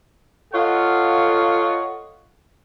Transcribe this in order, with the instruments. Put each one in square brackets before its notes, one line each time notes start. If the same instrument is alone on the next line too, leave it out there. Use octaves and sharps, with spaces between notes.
[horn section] F4 A4 C#5 D#5 F5 F#5